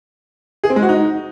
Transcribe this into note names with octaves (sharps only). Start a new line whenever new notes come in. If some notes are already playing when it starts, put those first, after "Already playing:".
G#4
C4
G#3
F#4
D#4